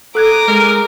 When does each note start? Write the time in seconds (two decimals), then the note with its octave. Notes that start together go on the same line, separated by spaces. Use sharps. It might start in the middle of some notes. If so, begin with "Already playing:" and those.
0.15 A4 A#5 D6 D#6 F#6 G#6
0.47 G#3 A#4